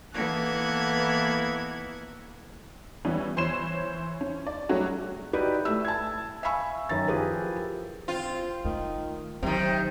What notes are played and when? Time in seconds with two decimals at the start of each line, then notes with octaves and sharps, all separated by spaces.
0.14 E3 A#3 B3 A4 F#6 G#6
3.05 E3 G3 B3 C#4
3.37 E3 C5 C#5 B5 C7 E7
4.21 C#4
4.47 D5
4.69 F#3 G3 A3 C#4 F#4 G#4
5.33 D#4 E4 F#4 G4 B4 D5
5.65 A3 E5 B5 E6
5.85 A5 G#6
6.43 E5 F5 G#5 B5 C#6 E6
6.89 F#2 D#3 A#5 A6
7.07 F3 E4 G4 G#4 A#4 B4
8.08 C4 F4
8.65 D#3 A3
9.43 C3 D#3 F#3 C4